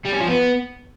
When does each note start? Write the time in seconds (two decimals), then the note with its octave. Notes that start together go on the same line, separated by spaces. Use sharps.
0.05 G3
0.13 C#4
0.20 F3
0.28 B3